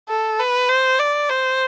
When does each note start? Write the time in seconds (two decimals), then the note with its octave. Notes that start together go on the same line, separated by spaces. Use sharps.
0.10 A4
0.40 B4
0.69 C5
0.99 D5
1.29 C5